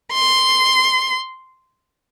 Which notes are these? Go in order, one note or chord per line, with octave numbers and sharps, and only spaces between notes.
C6